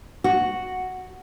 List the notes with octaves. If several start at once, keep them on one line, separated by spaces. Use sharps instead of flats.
F#4